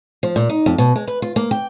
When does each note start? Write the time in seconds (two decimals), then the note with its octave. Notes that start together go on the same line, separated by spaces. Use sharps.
0.23 F3
0.36 A#2
0.50 D#4
0.66 F2
0.78 B2
0.96 G#3
1.08 B4
1.22 F4
1.36 A#3
1.51 G5